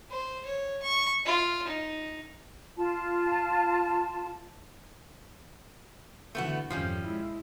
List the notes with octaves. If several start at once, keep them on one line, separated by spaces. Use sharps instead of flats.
C5
C#5
C#6
F4
D#4
F4 A5
D3 E3 A3 B3 F#4
G#1 F2 F3 G3 C#4
G#3 E4